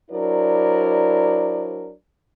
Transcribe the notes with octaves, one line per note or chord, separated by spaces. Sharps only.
F#3 D4 E4 A#4 C5 D5